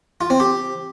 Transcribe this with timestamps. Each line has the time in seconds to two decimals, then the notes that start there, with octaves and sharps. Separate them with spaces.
0.21 F4
0.30 C4
0.40 G4